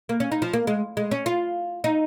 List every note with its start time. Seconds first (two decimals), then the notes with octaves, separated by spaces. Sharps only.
0.09 A#3
0.20 C#4
0.32 D#4
0.42 F3
0.53 A#3
0.67 G#3
0.97 G#3
1.11 C#4
1.26 F4
1.84 D#4